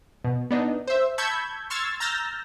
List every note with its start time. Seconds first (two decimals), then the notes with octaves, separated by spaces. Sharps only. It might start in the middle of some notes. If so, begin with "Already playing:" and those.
0.24 B2
0.51 B3 D4 D#4
0.87 C5 E5
1.18 A5 B5 C#6 E6 G6 G#6
1.70 C6 C#6 E6 F6 G#6 A6
2.00 A#5 E6 F6 G6 A6 A#6